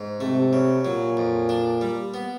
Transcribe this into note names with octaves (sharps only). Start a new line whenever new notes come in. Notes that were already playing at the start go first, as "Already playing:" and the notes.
Already playing: G#2
C3 A3
C#3
A#2 F#3
F2
D4
G3
B3